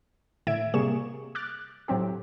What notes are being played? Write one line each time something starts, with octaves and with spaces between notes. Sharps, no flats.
A2 D3 E5 G#6 D7 E7
C3 G3 A#3 G#4 C#6 E7
D6 F6 F#6 A6
A2 F#3 C4 G4